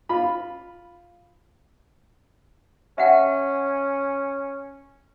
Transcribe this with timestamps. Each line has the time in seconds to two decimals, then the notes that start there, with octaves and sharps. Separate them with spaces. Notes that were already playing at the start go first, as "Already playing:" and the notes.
0.09 F4 B5
2.98 C#4 E5 F#5 G5